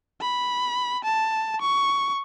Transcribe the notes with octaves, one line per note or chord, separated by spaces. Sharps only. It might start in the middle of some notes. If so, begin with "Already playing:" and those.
B5
A5
C#6